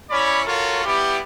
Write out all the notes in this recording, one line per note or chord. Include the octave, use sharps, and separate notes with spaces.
C#4 E4 C#5 D5 B5
F4 F#4 A4 A#4 C#5
G3 B3 E4 G4